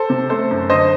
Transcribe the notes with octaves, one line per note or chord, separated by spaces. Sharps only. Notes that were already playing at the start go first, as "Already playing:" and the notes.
Already playing: A4 C5
C3
A3 A4 C5
F#2
D3 C5 D#5